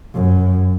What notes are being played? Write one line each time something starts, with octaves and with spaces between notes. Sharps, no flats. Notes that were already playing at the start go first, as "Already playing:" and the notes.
F#2